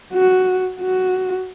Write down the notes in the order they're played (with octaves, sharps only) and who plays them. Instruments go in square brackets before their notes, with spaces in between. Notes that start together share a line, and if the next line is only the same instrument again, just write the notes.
[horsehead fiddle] F#4
F#4